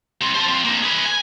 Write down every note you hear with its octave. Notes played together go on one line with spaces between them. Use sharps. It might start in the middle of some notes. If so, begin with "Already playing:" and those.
G3 C4
C5 A5
F3 C4
A#3 D4
G#4 B4
G#5